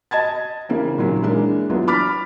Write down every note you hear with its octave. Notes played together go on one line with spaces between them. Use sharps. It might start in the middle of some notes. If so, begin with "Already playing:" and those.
D#5 A5 G#6 A6
C#3 E3 A#3 C4
A#2 D#3 F#3
E3 G#3 A#3 D4
E3 F#3 B3 D4 F4
B5 D6 F6 A6 B6